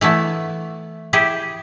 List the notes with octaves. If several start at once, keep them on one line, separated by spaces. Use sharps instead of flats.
E3 A3 B3 E4
E4 G4 G#4